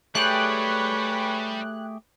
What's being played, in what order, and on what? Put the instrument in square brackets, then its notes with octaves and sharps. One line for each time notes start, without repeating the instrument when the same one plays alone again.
[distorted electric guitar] G3 [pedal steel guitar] A3 G4 G#4 [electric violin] B4 C#5 [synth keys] G5 F#6